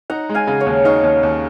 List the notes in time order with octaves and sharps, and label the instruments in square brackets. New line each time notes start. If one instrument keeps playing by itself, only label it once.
[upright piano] D#4 [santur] F#5 A#5
[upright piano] G#3
[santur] F5 G#5
[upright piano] C#3
[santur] C#5 F5
[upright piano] D#2
[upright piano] D#4 [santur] C#5 F5
[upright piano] D#2
D#2